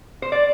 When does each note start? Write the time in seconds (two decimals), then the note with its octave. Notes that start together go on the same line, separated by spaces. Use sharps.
0.22 C5
0.32 D5